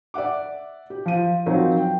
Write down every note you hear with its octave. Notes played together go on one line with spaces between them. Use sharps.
D5 E5 F#5 D6
G4
F3 D#7
F3 F#3 C4 D#4 A#4
G5